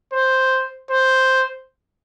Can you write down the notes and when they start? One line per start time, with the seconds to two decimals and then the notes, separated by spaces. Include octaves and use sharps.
0.14 C5
0.91 C5